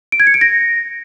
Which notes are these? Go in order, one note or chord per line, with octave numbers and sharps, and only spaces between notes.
D7
G#6
C#7
D7
A#6